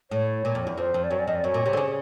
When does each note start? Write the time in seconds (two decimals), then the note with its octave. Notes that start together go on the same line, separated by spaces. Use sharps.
0.11 A2 C#5
0.45 A#2
0.55 F2
0.67 E2
0.78 F2 C5
0.94 F2
1.04 D5
1.11 F#2 C#5
1.19 D5
1.27 F2 D#5
1.35 D5
1.44 F#2 C#5
1.54 A#2
1.66 C3
1.73 D3
1.77 C#3